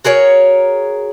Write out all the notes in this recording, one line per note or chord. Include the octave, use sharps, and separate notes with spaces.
F#4 G#4 A#4 C#5